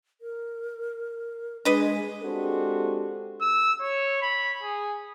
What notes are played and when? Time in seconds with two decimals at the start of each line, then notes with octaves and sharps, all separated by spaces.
0.21 A#4
1.65 G#3 D4 B4 D#5
2.23 G#3 C4 D4 F#4 G4 A4
3.42 E6
3.81 C#5
4.22 B5
4.63 G#4